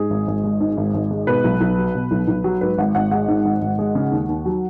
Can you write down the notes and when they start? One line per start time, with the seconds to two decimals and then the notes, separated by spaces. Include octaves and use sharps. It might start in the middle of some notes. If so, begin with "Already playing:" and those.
Already playing: G#2 G#4
0.10 G#1
0.27 G#1
0.44 G#3
0.60 G#2
0.77 G#1
0.94 G#1
1.11 G#3
1.27 B2 B4
1.44 B1
1.61 B1
1.78 F#3
1.95 B2
2.11 B1
2.28 B1
2.44 F#3
2.61 G#2 B4
2.78 G#1 F#5
2.95 G#1 F#5
3.11 G#3 F#5
3.28 G#2
3.45 G#1
3.62 G#1
3.79 G#3
3.95 C#3
4.12 D#2
4.29 D#2
4.46 F#3